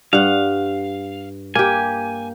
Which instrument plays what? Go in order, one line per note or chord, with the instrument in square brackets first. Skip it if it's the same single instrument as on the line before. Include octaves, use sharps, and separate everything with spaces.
[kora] G2 F#5 [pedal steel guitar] F5
[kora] A#3 G4 [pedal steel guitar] G#5